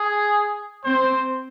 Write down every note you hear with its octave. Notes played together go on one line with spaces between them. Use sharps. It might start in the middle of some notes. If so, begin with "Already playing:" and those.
Already playing: G#4
C4 C5